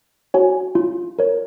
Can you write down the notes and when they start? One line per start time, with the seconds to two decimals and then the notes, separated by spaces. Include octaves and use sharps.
0.34 F#4 C#5 G#5
0.75 F4
1.19 A#4 C#5